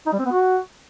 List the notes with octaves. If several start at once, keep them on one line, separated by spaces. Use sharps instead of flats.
D#4
G3
C4
B3
F#4